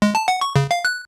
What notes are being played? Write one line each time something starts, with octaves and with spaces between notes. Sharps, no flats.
G#3
A5
F#5
C#6
C#3
F5
F#6